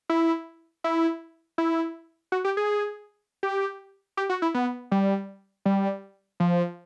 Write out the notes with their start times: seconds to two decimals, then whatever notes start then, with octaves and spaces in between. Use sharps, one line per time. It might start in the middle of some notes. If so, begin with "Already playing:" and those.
0.09 E4
0.84 E4
1.58 E4
2.32 F#4
2.45 G4
2.57 G#4
3.43 G4
4.17 G4
4.30 F#4
4.42 E4
4.54 B3
4.92 G3
5.65 G3
6.40 F3